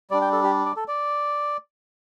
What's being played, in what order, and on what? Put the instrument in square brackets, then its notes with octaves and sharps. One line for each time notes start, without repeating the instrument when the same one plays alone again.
[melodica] G3 D5
D4
G5
A4
G4
D5
A4
D5